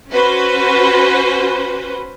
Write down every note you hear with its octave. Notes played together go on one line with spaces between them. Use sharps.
C#4 F#4 B4 C5